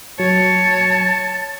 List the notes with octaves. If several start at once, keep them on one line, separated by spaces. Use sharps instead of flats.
F#3 C#5 A5